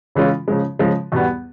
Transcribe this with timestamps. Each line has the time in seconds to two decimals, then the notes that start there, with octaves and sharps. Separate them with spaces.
0.15 C#3 E3 G#3 C#4 F4
0.48 C#3 F3 G#3
0.79 C#3 F3 G#3
1.12 E2 B2 G3 B3